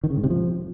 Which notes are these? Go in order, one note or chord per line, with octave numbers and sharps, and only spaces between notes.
D#3
C#3
G#2
C3
F3